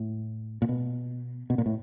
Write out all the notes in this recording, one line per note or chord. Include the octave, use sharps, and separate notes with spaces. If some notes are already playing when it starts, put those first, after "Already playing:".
Already playing: A2
A#2
B2
B2
A#2
A2